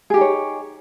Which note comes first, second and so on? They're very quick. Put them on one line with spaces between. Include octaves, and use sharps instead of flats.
G#4 G4 D#4 C#5